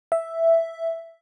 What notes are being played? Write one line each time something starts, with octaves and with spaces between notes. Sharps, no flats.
E5